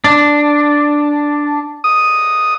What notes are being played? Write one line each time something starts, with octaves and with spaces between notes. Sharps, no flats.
D4
D#6